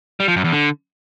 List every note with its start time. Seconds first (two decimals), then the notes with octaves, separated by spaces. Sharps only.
0.20 G3
0.28 F3
0.36 F#2
0.44 E2
0.52 D3